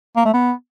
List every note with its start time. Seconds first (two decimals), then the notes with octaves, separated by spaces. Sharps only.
0.17 A#3
0.25 A3
0.34 B3